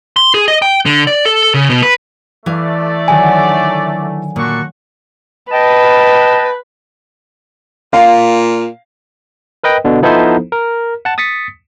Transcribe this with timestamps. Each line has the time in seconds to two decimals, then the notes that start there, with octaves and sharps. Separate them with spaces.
0.16 C6
0.34 G#4
0.48 D#5
0.62 G5
0.86 D3
1.07 D5
1.25 A4
1.54 C#3
1.70 B2
1.83 B4
2.46 E3 A3 D5 F5
3.08 D3 D#3 F#3 G#5
4.36 A#2 D4 F#4 C#6
5.52 B4 D#5 G5 A5
7.93 A#2 F5
9.64 A#4 B4 D#5 G5
9.85 B2 D3
10.02 F3 B3 D#4 E4 A4 C5
10.52 A#4
11.05 F#5 A5
11.18 D#6 A6 B6 C#7